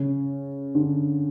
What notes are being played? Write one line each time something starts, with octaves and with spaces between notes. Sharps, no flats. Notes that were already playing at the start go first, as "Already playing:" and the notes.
Already playing: C#3
D3